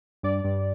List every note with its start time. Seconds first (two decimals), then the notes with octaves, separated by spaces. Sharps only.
0.23 G2 D5
0.44 G2